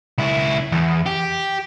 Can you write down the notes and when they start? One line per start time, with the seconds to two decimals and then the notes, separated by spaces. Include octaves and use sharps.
0.18 C#2 E4
0.72 E2
1.06 G4